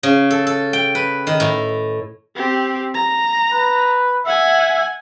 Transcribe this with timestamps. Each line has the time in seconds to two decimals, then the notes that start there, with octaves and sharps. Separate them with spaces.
0.03 C#3
0.31 A4
0.47 A4
0.73 G5
0.95 B4
1.27 D#3
1.40 A2
2.35 C4 G4
2.94 A#5
3.53 B4
4.26 E5 F#5 G#5